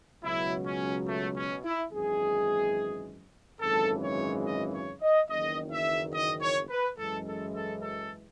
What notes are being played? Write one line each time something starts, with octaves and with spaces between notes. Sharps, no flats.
C#2 B2 F#3 E4
C#4
A3
C#4
E4
G#1 F#2 E3 G#3 G#4
G#1 F#2 C#3 E3 G#3 A4
C#5
D#5
C#5
D#5
F#1 E2 D#3 D#5
E5
D#5
C#5
B4
F#2 E3 G#3 A4
A4
A4
A4